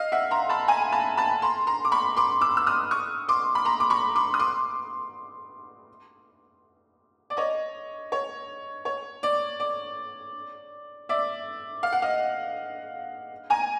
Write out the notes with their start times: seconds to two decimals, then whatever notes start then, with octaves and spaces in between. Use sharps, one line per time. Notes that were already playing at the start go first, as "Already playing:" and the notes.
Already playing: D#5 F5
0.12 E5 F#5
0.31 A#5 C6
0.49 A5 B5
0.68 G#5 A#5
0.92 A5 B5
1.17 A5 B5
1.42 A#5 C6
1.67 A#5 C6
1.85 D6
1.92 B5 C#6
2.17 C6 D6
2.41 D6 E6
2.57 E6
2.67 D#6 F6
2.91 C#6 D#6
3.29 C6 D6
3.55 B5
3.65 A#5 C6
3.80 D6
3.90 B5 C#6
4.16 C6 D6
4.34 D#6
4.39 C6 D6
7.30 D5
7.37 C#5 D#5
8.12 C#5
8.85 C#5
9.23 D5
9.60 D5
11.09 D5 E5
11.83 F5
11.93 F#5
12.02 D#5 F5
13.50 G#5 A#5